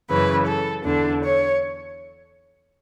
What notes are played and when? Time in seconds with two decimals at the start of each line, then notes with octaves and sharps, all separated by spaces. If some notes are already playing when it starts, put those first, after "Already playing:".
0.09 F#2 C#3 E3 B4
0.47 A4
0.85 E2 D3 D4
1.23 C#5